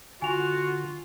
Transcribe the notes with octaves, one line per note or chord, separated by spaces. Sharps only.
D3 F4 F#4 G#5 F7